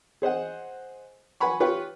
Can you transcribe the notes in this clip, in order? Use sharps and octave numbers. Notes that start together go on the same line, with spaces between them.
G#4 C5 D#5 F#5
B4 F#5 G#5 B5 C#6
F4 G4 B4 C#5 G5 C#6